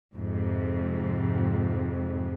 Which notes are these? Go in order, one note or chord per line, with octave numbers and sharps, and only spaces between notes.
F2 G#2 C3